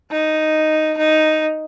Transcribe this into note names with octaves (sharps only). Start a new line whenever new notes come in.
D#4
D#4